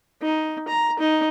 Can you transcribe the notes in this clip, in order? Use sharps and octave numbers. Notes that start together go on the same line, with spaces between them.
D#4
A#5
D#4